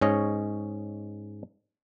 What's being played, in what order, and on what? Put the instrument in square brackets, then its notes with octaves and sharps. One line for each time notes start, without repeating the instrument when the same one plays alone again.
[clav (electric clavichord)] G#2 C#4 C#5 D#5